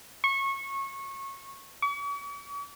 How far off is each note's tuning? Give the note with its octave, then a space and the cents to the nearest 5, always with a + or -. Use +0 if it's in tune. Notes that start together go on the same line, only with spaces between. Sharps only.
C#6 -20
C#6 +45